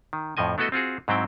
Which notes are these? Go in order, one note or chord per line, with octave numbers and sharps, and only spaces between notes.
D#3
F2 A2 F3 D#5 G#5
A3 B3 E4 F#4 A4 D#5
C4 F4 F#4 G#4
G#2 F#3 C4 E4 G5